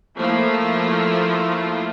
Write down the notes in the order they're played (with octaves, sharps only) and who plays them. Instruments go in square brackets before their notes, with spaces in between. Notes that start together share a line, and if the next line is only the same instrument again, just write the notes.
[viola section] F3 A3 A#3 E4 F4